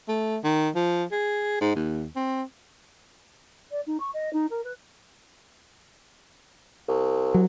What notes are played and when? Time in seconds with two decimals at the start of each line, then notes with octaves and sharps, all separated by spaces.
0.08 A3
0.44 D#3
0.75 F3
1.12 G#4
1.61 G#2
1.75 D#2
2.16 C4
3.71 D5
3.86 D#4
4.00 C#6
4.13 D#5
4.33 D#4
4.50 A#4
4.64 B4
6.88 C2
7.34 F#3